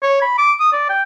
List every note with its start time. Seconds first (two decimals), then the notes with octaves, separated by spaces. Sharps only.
0.03 C#5
0.22 B5
0.38 D6
0.60 D#6
0.73 D5
0.90 G5